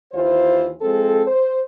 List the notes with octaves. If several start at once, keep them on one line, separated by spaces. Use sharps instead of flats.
D#2 E3 F4 C5
F3 G#3 C4 A4
C5